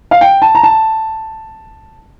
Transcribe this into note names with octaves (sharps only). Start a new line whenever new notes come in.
F5
G5
A5
A#5
A5